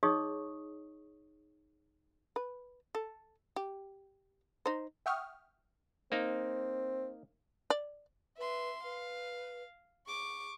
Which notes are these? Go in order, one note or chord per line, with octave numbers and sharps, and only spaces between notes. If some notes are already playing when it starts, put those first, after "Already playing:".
D#4 G#4 C#5 D#5 C#6 D#6
B4
A4
G4
D#4 C5
E5 F#5 G5 C#6 D#6 F6
A#3 C4 D#4
D5
B4 E5 C6
B4 F5
G#4 C#6 D6